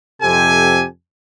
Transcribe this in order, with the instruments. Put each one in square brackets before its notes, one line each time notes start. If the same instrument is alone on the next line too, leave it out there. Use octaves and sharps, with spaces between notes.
[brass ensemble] F2 C3 G4 A4 C5 G#5